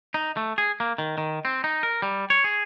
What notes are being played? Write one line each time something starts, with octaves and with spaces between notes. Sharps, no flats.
D#4
A3
G#4
A#3
D#3
D#3
C4
D#4
A#4
G3
C#5
G#4